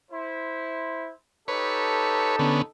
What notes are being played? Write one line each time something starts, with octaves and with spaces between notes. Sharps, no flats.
E4 C5
D#4 G4 A4 B4 C#5
D3 B3 C#4